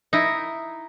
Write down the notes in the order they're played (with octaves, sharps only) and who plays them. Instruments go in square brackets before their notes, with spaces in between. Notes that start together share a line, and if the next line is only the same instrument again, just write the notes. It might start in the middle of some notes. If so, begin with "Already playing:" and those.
[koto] D#4 E4